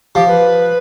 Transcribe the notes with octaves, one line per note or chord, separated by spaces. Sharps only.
F3 G4
B4